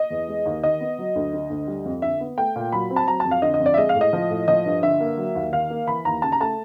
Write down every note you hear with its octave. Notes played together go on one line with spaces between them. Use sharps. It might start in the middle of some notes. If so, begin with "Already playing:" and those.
Already playing: D#5
E2
G#3
D#2
D#3 D#5
B3
F#3
D2
D3
D2
G3
F2
D3 E5
B3
A3 G5
A#2
F#3 B5
C4
A5
F#3 A#5
F2 A5
F5
D3 D#5
D#5
F2
D5
E5
G#3 D#5
F5
A2
D#5
F3
A2
F3 D#5
G2
D3 E5
A#3
F#3
D#2
D#3 F5
A#3
E3 B5
D#2 A#5
C#3 A5
A#5
A3 A5